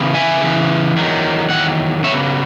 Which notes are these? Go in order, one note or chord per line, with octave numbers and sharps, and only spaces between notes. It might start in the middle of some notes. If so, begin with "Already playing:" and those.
Already playing: C#3 E3 B3
E5 G#5
C#3 E3 B3
E2 D#3 F#3
E2 D#3 F#3 F#5
C#3 F#3 B3 C#5 E5